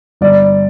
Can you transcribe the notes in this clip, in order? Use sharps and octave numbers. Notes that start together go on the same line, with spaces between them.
G1 D5